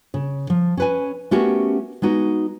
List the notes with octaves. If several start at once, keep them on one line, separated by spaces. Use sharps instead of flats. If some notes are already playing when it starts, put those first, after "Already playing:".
C#3
F3
C#4 B4 G#5
A3 B3 C#4 F#4 G4 A#4
G#3 B3 D#4 F#4